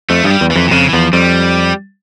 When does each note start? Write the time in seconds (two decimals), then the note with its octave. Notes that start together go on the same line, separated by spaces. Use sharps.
0.09 F2 A3
0.24 G2 F3
0.30 G3
0.41 E2
0.51 F2 E3
0.67 A#2
0.71 F2 C#3
0.89 E3
0.93 E2 F3
1.13 F2 G3